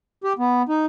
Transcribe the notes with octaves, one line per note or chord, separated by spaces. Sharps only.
G4
B3
D#4